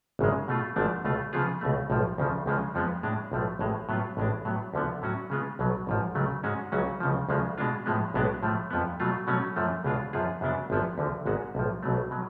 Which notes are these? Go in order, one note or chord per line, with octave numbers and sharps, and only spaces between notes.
G#1 F#2 C#3 G#3
B2 A3 F4
G#1 G#2 F3 A3 D4
C#2 B2 A3 F4
C#3 F3 B3 F4 G#4
C#2 B2 A3
B1 A2 F3
D2 C#3 F3
C#2 C#3 F3 G#3
F2 F3 G#3 B3
A2 G#3 D4
B1 A2 F3 A3
A1 A2 G#3
A2 F#3 B3 F4
A1 A2 G#3 D4
A2 F#3 B3
D2 D3 F3 B3
A2 F#3 C#4 F#4
C#3 G#3 B3 F4
B1 B2 F#3
A1 G#2 F3
C#2 C#3 F#3 A3
G#2 G#3 C#4 F#4
C#2 C#3 F#3 C#4 F#4
C#2 C#3 F3
D2 C#3 F3 G#3
B2 G#3 D4 F4
A2 F3 G#3 B3
B1 A2 G#3 B3 D4
A2 F3 A3
F2 F3 B3
B2 F#3 A3 F4
B2 F#3 A3 C#4
F#2 F3 A3
C#2 B2 G#3 D4 F4
F#2 F3 B3 F4 G#4
F#2 C#3 F#3 B3 D4
G#1 F#2 F3 B3
D2 D3 F3
G#1 G#2 G#3 B3 F#4
B1 A2 F3
B1 B2 F#3 A3
B2 F#3